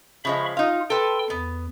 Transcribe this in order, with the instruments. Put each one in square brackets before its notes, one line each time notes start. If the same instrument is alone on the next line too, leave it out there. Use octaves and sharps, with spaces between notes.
[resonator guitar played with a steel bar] C#3 F3 G#3 [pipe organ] E5 B5 C#6
[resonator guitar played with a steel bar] D#4 F5 [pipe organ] F4
[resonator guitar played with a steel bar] A4 B4 [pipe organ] G5 C6 E6
[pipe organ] E2 [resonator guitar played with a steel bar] B3